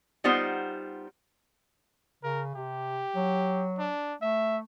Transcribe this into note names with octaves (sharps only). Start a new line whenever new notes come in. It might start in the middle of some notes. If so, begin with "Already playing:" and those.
G3 B3 D#4 F4 C5 F#5
C#3 A#4
C3 G4
F#3
D4
A3 E5